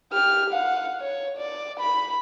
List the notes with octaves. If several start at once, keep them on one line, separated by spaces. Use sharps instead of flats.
G4 F6
F5 F#5
C#5
D5
B5